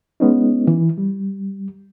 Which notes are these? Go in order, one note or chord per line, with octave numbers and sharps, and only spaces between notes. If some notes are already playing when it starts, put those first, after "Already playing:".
G#3 B3 C#4 D#4
E3
G3